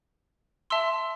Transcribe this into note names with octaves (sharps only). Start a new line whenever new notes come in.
E5 A5 C6 E6